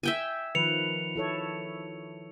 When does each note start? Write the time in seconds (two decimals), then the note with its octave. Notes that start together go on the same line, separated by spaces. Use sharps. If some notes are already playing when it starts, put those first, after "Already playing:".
0.03 E5 G5 G#5
0.55 D#3 F3 B4 C#7 F7
1.16 E4 A4 C#5